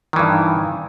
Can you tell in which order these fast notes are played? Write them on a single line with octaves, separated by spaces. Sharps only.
D#3 E3 G2